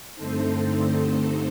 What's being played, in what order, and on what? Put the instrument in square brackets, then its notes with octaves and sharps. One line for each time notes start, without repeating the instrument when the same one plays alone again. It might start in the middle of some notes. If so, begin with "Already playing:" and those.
[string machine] G2 D3 A3 C4 D#4 A4 C5